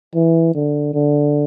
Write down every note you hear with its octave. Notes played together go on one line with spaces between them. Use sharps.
E3
D3
D3